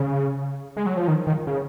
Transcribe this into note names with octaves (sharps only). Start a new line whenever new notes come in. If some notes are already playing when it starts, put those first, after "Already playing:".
Already playing: C#3
G#3
F#3
F3
D#3
D#3
C#3